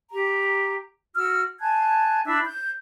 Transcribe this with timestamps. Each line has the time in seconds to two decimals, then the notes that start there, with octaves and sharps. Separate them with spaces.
0.11 G4 A#5
1.14 F#4 E6 F6
1.59 G#5 A5 F#6 G#6
2.25 D4 E4 E5 E6
2.44 G6